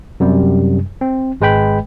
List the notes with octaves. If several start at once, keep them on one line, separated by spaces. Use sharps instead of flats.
F#2 C3 G3
C4
G#1 G#3 B4 G5 B5